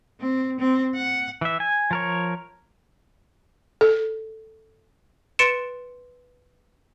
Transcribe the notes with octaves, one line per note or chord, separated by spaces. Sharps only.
C4
C4
F#5
E3 E5
G#5
F3 A#4 C#5
A4
B4 C6 A6 C#7 D7 E7